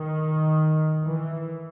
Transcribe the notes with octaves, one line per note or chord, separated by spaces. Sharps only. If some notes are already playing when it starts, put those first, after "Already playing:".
Already playing: D#3
E3